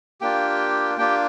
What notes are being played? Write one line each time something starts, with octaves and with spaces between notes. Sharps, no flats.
A#3 D4 F4 G4 G5
A#3 D4 F4 G4 G5